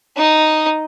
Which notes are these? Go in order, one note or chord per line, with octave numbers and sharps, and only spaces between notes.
D#4 D#5